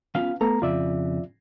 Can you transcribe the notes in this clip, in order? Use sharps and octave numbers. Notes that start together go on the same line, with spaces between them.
B3 C#4 F4 F5
A3 B3 A4 A#5
F2 C#3 F4 D5 E5